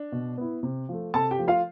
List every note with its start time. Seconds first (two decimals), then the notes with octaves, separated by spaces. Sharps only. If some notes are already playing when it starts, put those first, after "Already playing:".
Already playing: D4
0.12 B2
0.37 B3 E4
0.63 C3
0.89 F3 A3
1.14 C3 A4 A5
1.31 G4 G5
1.39 F3 A3
1.48 F4 F5